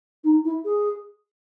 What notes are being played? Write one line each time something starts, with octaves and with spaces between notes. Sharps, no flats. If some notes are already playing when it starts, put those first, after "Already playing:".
D#4
E4
G#4